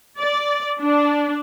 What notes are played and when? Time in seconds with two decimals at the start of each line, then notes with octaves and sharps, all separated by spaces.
0.19 D5
0.82 D4